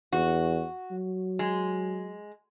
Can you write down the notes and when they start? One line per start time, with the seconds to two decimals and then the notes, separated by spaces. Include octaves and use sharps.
0.13 E2 F#4
0.91 F#3
1.39 G#3